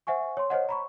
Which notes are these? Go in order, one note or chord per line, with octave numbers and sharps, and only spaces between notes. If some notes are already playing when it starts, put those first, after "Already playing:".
C5 E5 F#5 G#5 C#6
C#5 C6
C5 C#5 D#5 F#5
A#5 B5 C#6